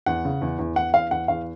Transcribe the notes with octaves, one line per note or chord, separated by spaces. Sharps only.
E2 F#5
C#3
E2
E2
E2 F#5
E2 F5
E2 F#5
E2 F5